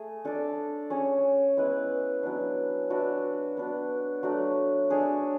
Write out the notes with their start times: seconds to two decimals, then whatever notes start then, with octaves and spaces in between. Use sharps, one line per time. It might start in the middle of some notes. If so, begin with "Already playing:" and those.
Already playing: A3 G#4
0.25 D4 A4 D5
0.90 C#4 G#4 C#5
1.57 G#3 B3 E4 B4
2.23 F#3 B3 D4
2.90 D4 F#4 B4 E5
3.57 B3 D4 F#4
4.23 F#3 A3 D4 F#4
4.90 D4 G#4 C#5 E5